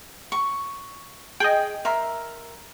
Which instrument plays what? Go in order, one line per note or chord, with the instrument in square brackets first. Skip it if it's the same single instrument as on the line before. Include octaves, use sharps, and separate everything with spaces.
[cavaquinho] C#6
[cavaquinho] G#4 [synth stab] D#5 G5
[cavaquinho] A#4 E5 C6